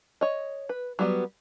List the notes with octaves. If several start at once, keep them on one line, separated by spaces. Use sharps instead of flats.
C#5 D#5
B4
F#3 G3 B3